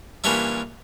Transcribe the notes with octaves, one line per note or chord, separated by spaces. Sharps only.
A#2 E3 G3 C#4 D4 E4